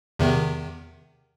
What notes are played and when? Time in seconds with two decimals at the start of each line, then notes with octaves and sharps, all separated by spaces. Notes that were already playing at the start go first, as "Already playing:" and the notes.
0.19 E2 C3 D#3